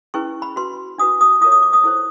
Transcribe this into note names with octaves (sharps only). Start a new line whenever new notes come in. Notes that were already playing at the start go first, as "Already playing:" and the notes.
C#4 E4 G#4 B4 C#6
B5
F#4 B4 C6
D4 F#4 B4 D#6
D#6
F4 A#4 C#5 D#6
D#6
D6
D#6
E4 A4 C5